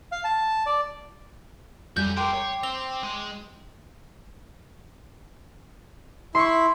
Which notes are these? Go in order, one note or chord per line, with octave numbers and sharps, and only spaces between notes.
F5
A5
D5
F2 G3 F#4 G#5 G6
G#3 A#4 G5 C6 D6
C#5
C4 F7
G#3
E4 C6 C#6